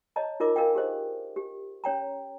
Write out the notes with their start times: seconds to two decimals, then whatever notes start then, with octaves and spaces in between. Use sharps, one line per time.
0.16 C#5 D#5 A5 A#5
0.40 D#4 F4 A#4 D#5 D6
0.56 D4 A#4 D#5 F5 G5
0.75 G4 G#4 C5 D#5
1.36 G4
1.84 C#4 C#5 G5 A#5